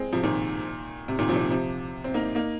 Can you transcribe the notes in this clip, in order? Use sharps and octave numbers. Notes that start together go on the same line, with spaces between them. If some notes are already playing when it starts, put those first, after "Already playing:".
Already playing: G#3 C4
C3 F3
A#2 D#3
C3
A#2 D#3
C3 F3
A#2
C3
C3 F3
C4
A#3 D#4
A#3 D#4